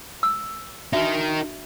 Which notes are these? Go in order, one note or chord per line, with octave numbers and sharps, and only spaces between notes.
E6
D4 D#4 F#4 A#4 E5